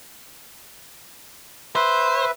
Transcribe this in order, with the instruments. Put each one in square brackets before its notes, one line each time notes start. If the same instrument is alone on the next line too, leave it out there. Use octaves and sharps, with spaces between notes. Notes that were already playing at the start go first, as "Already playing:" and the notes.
[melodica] B4 E5 [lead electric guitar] C5